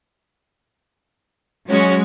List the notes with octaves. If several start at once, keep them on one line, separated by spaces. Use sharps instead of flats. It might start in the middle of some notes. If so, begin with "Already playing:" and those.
F#3 G#3 C#4 F#4 C#5